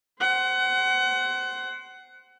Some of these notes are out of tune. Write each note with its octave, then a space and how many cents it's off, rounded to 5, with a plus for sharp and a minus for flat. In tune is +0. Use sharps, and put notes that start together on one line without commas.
C5 +0 F#5 +25